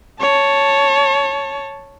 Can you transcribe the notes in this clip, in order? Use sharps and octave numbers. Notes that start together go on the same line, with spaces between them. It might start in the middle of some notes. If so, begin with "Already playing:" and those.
C#5 A5